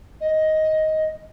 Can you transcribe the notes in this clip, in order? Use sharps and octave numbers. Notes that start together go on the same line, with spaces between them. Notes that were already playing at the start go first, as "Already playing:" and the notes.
D#5